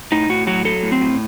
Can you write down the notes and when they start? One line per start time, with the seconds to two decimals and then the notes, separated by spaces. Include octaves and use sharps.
0.12 A2 D#4
0.29 A2 F#4
0.47 F#3 F#4
0.65 F#3 A4
0.83 A2
0.92 C4
1.01 A2